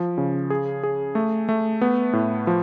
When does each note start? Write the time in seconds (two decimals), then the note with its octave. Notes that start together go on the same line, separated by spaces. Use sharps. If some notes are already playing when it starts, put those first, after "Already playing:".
Already playing: F3
0.18 C#3
0.50 G#4
0.83 G#4
1.15 A3
1.49 A3
1.81 B3
2.13 A2
2.47 F3